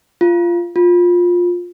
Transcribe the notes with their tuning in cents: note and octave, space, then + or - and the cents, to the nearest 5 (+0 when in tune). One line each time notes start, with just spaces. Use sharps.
F4 -15
F4 +15